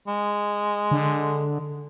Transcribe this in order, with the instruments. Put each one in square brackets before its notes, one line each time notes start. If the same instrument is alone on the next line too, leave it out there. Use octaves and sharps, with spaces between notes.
[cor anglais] G#3
[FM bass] D3